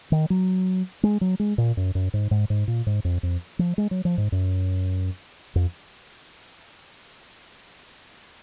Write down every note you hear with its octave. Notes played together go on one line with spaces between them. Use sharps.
D#3
F#3
G#3
F#3
G#3
A#2
F#2
F#2
G#2
G#2
G#2
A#2
G#2
F2
F2
F3
G#3
F#3
F3
G#2
F#2
F2